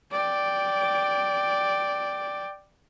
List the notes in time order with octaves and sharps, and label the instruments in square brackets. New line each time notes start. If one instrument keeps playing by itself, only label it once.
[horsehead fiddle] D5 G5